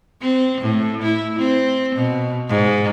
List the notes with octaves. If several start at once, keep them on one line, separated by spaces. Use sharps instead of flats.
C4
A2
E4
C4
B2
G#2